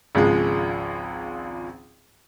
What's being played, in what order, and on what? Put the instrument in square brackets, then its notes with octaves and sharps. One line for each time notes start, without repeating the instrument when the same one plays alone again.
[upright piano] G#1 C#2 F3 G#3